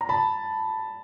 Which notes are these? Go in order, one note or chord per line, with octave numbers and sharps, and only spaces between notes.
A#5
A5 B5